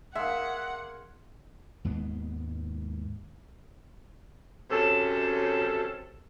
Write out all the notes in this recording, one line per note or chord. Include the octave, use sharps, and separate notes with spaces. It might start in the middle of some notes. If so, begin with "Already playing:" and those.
A#3 G#4 E5 F#5 C6
D#2 G#2 G#3 B3
F#2 C3 C#4 A4